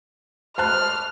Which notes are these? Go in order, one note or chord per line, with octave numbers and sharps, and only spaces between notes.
C5 A5 F6 F#6